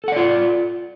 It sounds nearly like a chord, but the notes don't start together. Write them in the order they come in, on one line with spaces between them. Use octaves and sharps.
A4 F#5 D5 F4